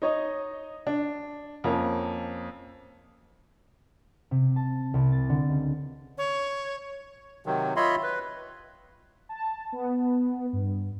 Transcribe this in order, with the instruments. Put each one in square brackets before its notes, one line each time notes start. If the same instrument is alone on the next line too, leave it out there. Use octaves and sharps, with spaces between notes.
[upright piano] D#4 C#5 D#5
D4
F2 F3 A#3 C#4
[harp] C3
A5
C2
A6
D3
C#2
[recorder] C#5
[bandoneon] C3 D#3 F#3
F4 C#5 D#5 E5 B5 C6
B4
[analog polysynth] A5
B3
G2